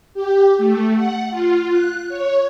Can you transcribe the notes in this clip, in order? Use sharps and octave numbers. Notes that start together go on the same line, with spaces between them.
G4
A3
F#5
F4
F#6
C#5